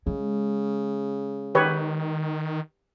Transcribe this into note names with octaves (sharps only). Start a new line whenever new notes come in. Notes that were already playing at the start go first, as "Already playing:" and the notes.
C#3 G#3
D#3 G4 B4 C#5